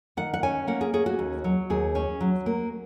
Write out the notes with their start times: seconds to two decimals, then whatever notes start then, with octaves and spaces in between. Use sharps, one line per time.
0.17 D#3 F#5
0.34 F#5
0.43 C#4 G#5
0.67 A#3 F#5
0.81 G#4
0.93 C#4 G#4
1.06 F#4
1.19 D#2
1.44 F#3
1.70 D#2 G#4
1.95 C#4
2.21 F#3
2.46 A#3